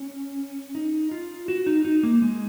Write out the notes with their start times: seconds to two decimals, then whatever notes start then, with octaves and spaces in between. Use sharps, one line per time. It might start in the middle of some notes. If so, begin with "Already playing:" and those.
Already playing: C#4
0.75 D#4
1.11 F4
1.48 F#4
1.66 D#4
1.85 D#4
2.03 A#3
2.22 G#3